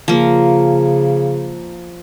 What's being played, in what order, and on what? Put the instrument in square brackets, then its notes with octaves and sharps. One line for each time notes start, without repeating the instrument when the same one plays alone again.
[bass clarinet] C#3 [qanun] F3 A#3